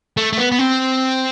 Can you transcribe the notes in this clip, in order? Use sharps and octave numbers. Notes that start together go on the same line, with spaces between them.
A3
A3
B3
B3
C4